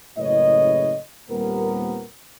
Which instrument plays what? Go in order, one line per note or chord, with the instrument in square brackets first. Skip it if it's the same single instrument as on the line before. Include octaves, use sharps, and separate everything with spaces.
[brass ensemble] F#1 A2 C#3 B4 C#5 D#5
D#2 A#2 G3 B3 C4 A#4